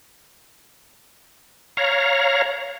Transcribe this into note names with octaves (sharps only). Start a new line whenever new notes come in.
C#5 F5 A#5